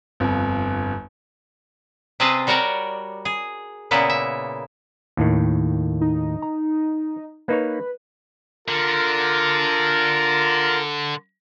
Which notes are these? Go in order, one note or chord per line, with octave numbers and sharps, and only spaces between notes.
G1 F2
C3 C4 G#4 B4 D#5 A5
G3 F#4 A#4 C#5 D5
G#4
A#2 C#3 A#3 B3 E4
E5
D#2 A2 D#3
D#4
A#5
A#3 D#4 B4 C#5
D3 F4 A#4